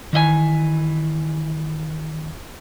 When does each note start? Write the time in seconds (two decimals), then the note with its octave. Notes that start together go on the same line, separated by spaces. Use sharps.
0.13 D#3 E3 D#5 G#5